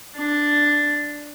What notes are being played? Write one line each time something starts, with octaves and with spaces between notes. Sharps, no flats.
D4